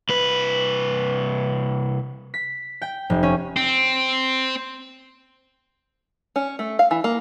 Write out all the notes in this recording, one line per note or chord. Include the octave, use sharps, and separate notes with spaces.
C2 B4
B6
G5
F1
C#4
C4
C#4
A3
F5
E3
A#3